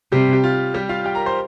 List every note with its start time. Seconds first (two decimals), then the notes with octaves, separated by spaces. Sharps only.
0.12 C3 G3 G4
0.33 G4
0.44 F4
0.74 G3 G4
0.89 F4 F5
1.05 G4 G5
1.15 A#4 A#5
1.26 C5 C6